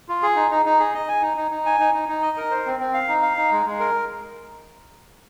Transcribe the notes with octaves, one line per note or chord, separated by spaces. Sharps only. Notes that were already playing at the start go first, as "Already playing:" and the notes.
F4
G#4
D#4
D#4
D#4
G#4
D#5
G#5
D#4
D#4
D#4
G#5
D#4
D#4
D#4
D#5
A#4
C5
C4
C4
F5
D#4
F5
D#4
G#3
G#3
A#4